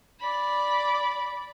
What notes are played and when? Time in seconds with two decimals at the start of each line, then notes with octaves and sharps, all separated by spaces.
0.20 D5 B5